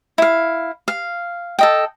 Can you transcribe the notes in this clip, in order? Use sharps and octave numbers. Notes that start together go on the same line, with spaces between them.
E4 F5
F5
A4 D#5 G5